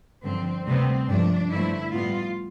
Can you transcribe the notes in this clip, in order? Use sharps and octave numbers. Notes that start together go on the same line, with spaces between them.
G2 D3 F3 C4
D2 C3 G3 B3 C4
G2 F3 A3 D4
G2 D3 F3 A3 E4
A2 G3 B3 F4